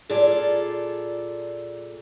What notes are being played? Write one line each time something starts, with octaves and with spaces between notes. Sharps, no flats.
A#2 F4 G#4 A4 D5